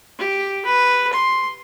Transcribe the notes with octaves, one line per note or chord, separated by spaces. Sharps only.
G4
B4
C6